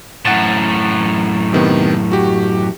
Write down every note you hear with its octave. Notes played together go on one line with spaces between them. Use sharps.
F#2 A2 F#5 A6 E7
C3 D#3 B3
F#4 G4